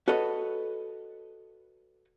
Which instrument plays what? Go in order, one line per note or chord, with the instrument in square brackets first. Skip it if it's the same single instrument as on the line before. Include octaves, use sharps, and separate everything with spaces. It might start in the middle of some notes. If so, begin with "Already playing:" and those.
[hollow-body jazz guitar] F#4 A4 B4 C#5 D#5